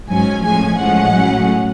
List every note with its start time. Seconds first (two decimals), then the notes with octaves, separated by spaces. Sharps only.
0.09 G#2 F#3 C#4 G#5
0.43 A2 F3 G#3 C#4 G#5
0.78 A2 F3 G#3 C#4 F#5
1.13 A2 F#3 C#4